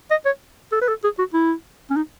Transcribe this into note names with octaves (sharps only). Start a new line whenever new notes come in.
D#5
C#5
A4
B4
A4
G#4
F#4
E4
C#4
D#4